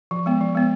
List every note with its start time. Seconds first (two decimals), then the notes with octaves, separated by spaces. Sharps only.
0.11 F3
0.26 G#3 B3
0.41 F3
0.55 G#3 B3